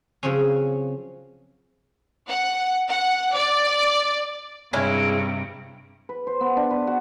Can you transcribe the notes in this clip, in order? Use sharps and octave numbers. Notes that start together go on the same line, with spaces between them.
C#3 F3 F#3 C4 C#4
F#5
F#5
D5
G2 C3 G#3 C#4 E4
B4
C5
B3
D4
B4
F#4